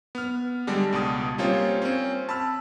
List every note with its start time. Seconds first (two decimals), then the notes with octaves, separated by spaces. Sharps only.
0.15 B3 F6
0.67 D3 G3 G#3 D4
0.93 C#2 B2 A5 D#6
1.38 G3 A#3 C4 C#4 F4 C#5
1.82 C4 C#4
2.29 A5 B5 E6 F6